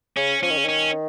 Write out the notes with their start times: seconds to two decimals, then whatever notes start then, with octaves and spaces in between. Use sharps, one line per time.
0.17 C#3 C#4
0.42 F3 C#4
0.50 D#3
0.58 C#3
0.65 D#3 C#4